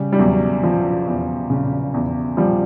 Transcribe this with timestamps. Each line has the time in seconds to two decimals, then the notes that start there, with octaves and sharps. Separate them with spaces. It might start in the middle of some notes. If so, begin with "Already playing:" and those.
Already playing: C#3 G3
0.13 G3
0.19 E2 F#3
0.63 F3
1.07 E2
1.50 C#3
1.94 E2
2.37 F3 G3